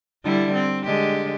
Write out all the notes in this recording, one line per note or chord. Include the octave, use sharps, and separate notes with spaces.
D3 G3 E4
C4
D3 G#3 G4